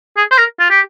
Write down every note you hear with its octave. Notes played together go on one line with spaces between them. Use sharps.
G#4
C5
A#4
F4
G4